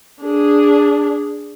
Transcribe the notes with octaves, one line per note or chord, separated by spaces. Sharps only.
D4 G#4